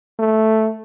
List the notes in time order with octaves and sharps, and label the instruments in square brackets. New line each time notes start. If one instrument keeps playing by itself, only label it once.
[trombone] A3